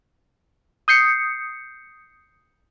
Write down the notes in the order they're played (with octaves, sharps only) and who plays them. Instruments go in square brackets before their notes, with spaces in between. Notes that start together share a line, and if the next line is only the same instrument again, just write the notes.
[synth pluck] D#6 G6 C7 C#7